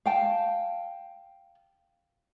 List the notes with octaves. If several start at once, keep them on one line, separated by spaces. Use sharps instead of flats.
F5 G5 A5